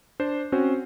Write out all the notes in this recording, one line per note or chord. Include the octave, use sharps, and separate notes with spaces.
D4 C5
C4 C#4 F#4 C5